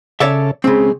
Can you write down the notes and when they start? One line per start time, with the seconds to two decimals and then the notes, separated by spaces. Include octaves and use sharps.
0.20 C#3 A4 C#5 D5 E5
0.64 C#3 G#3 C4